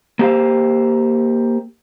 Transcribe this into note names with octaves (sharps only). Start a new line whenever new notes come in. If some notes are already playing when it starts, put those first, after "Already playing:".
A#3 G4 C5 F5